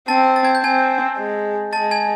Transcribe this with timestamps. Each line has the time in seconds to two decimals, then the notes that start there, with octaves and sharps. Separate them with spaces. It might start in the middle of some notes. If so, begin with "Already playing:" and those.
0.08 C4 A5 A6
0.36 A6
0.45 G#6
0.55 G6
0.64 C4 G#5 G#6
1.18 G#3
1.73 G#3 A5 A6
1.91 G#5 G#6